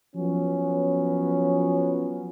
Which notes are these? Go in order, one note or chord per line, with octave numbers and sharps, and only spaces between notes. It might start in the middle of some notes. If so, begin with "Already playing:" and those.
F3 F#3 B3 C#4